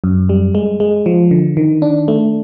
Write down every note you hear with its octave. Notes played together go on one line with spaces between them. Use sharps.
F#2
G3
G#3
G#3
F3
D3
D#3
D4
A3